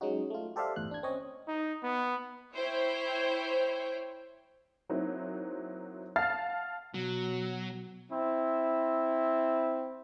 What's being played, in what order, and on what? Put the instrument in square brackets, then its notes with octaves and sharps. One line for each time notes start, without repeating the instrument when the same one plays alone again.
[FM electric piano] F#3 G#3 C#4 D#4 F#4
A3 F4
G4 A4 C5 D5 E5 F5
G1 E2 A2 F#6
D4 G#6
C4 C#4 C#5 D#5
[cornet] D#4
B3
[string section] E4 C5 C#5 G5
[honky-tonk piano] F#3 A#3 C4 D#4 E4
F5 F#5 A5 F6 A6 C7
[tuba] B2 [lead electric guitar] F#3
[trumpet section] C4 E4